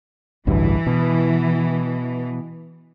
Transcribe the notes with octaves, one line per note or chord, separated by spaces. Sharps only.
A1 D2 G2 E3
B2